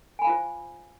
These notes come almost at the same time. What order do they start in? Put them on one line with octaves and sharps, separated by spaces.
G#5 B5 F5 F4 C5